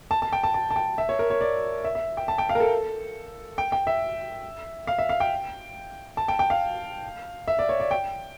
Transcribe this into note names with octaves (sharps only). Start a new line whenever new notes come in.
A5
A5
G5
A5
A5
A5
G5
E5
C#5
A#4
C#5
D5
E5
E5
G5
A5
G5
F5
A#4
A4
G5
G5
E5
F5
E5
F5
G5
A5
G5
G5
F5
E5
D5
C#5
D5
G5